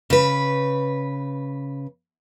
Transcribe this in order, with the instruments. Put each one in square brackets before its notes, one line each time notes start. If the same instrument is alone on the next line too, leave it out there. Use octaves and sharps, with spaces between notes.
[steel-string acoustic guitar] C#3 B4